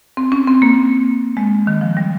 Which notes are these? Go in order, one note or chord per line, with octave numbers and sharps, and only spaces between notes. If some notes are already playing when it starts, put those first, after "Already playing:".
C4
C#4
C4
A#3
G#3
D#3
F3
G3